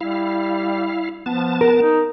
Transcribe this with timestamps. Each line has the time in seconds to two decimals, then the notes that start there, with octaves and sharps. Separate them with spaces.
0.01 G3 E4 F5
1.26 F3 B3 A5
1.61 A#4
1.81 D#4